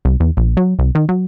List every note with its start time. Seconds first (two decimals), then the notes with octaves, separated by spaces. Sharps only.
0.05 C2
0.20 E2
0.37 A#1
0.57 F#3
0.79 C2
0.95 D#3
1.09 F#3